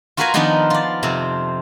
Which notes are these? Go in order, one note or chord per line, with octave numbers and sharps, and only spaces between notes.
F4 F#4 A#4 B4 F5 G#5
D#3 F3 B3 D4 D#4 F4
F4 D5
F2 C3 C4